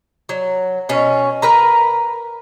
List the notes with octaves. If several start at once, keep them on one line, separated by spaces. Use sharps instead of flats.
F#3
B2 C#4
A#4 B4 A#5